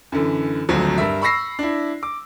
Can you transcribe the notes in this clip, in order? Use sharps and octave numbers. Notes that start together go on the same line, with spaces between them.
F#2 D3 E3
G#1 D2 F3 F#3
G2 A#4 E5
B5 C#6 E6 A#6 C7
D4 E4
D6